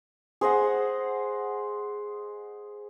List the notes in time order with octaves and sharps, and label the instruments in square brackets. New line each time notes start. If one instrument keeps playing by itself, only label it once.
[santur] G#4 C5 D#5 F#5